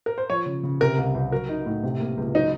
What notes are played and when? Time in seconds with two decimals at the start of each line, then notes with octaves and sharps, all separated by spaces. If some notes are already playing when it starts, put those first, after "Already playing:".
0.06 A#4
0.18 C5
0.30 F3 C#5
0.46 C#3
0.63 C#3
0.80 C3 A#4
0.98 C2
1.15 C2
1.31 F#3 A#4
1.49 D#4
1.66 A2
1.83 C3
2.00 A#3
2.17 C#2
2.34 F#3 D#4